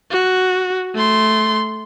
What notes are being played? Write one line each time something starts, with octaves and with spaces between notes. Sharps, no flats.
F#4
A3 C6